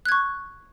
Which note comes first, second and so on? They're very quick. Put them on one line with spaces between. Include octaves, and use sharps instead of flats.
F#6 G#6 C#6